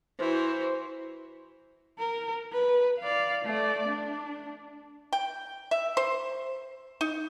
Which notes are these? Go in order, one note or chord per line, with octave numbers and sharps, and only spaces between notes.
E3 F#4 C5
A#4
B4
D5 F5
A3 D5
D4
G5
E5
C5
D#4